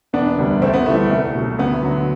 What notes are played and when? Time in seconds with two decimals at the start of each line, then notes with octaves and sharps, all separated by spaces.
0.13 E1 B3 D4
0.38 D2 C3 G3
0.62 D2 A3 C4
0.73 B3
0.86 C3 E3 G3 A3
1.10 C2 A3
1.35 B2 F#3
1.59 D2 B3
1.83 D3 F#3